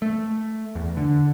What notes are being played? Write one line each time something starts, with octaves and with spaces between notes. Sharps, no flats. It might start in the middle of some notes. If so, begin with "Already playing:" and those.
A3
E2
D3